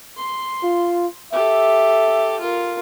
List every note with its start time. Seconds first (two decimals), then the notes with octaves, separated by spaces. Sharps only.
0.17 C6
0.63 F4
1.33 G4 A4 E5
2.40 F4 A#4